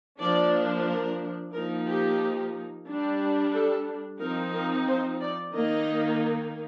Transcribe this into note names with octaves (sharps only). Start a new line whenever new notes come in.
F3 A#3 D4 D5
A#4
F3 A#3 D#4 A#4
G4
G3 D4
A4
F3 C4 D#4 A#4
A#4
C5
D5
D#3 A#3 D#4 D#5